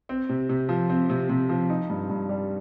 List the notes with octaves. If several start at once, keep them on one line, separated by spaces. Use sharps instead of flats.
C4
C3
C3
F3
C4
C3
C3
F3
D#4
G2
G2
G3